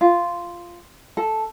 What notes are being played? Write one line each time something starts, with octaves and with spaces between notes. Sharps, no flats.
F4
A4